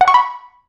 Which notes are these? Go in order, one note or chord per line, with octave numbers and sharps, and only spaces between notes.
F#5
C#6
B5